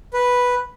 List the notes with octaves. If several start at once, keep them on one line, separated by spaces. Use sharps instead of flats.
B4